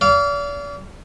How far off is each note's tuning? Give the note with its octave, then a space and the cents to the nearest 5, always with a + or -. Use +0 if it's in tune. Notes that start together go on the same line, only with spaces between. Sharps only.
D5 -40 F5 -15